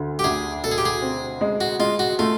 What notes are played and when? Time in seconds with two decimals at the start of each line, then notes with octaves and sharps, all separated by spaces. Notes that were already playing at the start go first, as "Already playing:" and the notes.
Already playing: D2 D3
0.19 G4
0.24 D2 G#4
0.64 B2 A4
0.71 G#4
0.78 G4
0.85 G#4
1.02 C4
1.41 G#3
1.61 F#4
1.79 G#3 F4
1.99 F#4
2.19 A3 F4